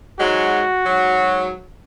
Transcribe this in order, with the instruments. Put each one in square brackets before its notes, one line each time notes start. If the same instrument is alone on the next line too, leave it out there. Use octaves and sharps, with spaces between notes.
[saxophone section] G#2 F#3 G#3 [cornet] F#4
[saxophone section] G#2 F#3